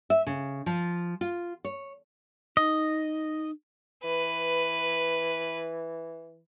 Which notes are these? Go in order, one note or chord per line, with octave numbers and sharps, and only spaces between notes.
E5
C#3
F3
F4
C#5
D#4 D#5
E3 B4